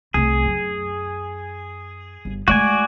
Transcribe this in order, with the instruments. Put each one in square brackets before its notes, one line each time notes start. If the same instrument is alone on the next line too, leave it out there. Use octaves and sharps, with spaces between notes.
[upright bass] C2 A3 [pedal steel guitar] G#4
[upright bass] F#2
G1
[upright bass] G#3 A3 [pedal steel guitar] F#4 D5 G#5